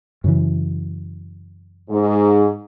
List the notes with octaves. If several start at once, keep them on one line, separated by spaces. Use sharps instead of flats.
F#2 C#3 E3
G#2